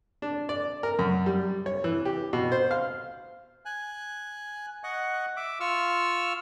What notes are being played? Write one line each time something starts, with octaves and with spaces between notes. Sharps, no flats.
D4
D5
A#4
F#2
G3
C#5
E3
G4
B2
C5
F5
G#5 F#6
D#5 F#5 C#6 F#6
E5 D6
F4 C#6 E6 F6